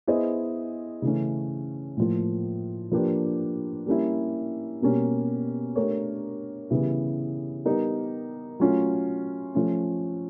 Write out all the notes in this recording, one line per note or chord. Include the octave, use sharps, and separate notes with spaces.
B3 E4 G#4 C5 D#5
C#3 E3 A3 C#4
A2 F3 A#3
F3 A#3 D4 G4 B4
G3 A#3 C#4 E4
B2 G3 A#3 C#4
A3 D4 G4 A#4 C#5
C#3 E3 G3 B3 E4
G3 B3 D#4 G4 A#4
F#3 A3 C#4 F4
F3 A3 C#4